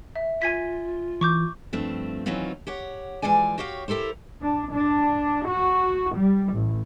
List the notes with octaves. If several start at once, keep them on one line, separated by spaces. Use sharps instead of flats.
E5
F4 G#5 G#6 B6
E3 C#6 D6 G6
G2 F3 A3 C4
D#3 E3 F#3 C4 C#4 F4
G4 C#5 F#5
E3 F3 G#3 D5 G#5
F#4 G4 C#5 F5 G5
E4 G4 A4 A#4 C5
D4
D4
F#4
G3
A1